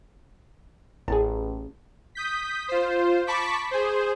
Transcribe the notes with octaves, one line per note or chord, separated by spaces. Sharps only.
A1 G#4 A5
D#6 G6 B6
F4 C5
A5 B5 C#6 D6 B6
G#4 C5